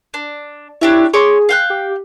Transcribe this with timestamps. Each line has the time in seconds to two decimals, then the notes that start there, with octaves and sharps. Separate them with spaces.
0.14 D4
0.81 D4 E4 G4 C#5
1.13 G#4 C#5 C6 D6
1.49 F5 G5 F#6
1.70 G4